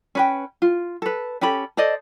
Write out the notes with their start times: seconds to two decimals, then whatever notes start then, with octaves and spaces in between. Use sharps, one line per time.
0.15 C#4 B4 G5
0.62 F4
1.02 A4 B4
1.41 C#4 G4 A4 B5
1.77 A4 C5 D5 D#5